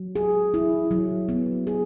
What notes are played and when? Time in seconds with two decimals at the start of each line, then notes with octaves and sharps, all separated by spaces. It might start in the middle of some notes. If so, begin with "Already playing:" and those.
Already playing: F#3
0.16 G#4
0.54 E4
0.91 F#3
1.29 B3
1.67 G#4